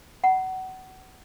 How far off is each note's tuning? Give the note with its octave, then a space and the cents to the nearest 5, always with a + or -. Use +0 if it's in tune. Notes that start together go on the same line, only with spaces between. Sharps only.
F#5 +25 B5 -40